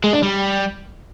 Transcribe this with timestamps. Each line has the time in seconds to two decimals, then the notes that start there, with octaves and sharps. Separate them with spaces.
0.04 G#3
0.13 D4
0.23 G3